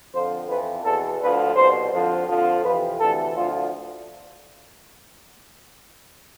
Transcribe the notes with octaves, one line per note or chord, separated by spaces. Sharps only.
F2 D3 F3 C5
F2 E3 B4
E2 B2 A4
D2 D3 F3 B4
C2 B2 C5
F2 D3 F3
F2 D3 F3
F2 C3 E3 B4
D2 C3 E3 A4
D2 D3 F3 F4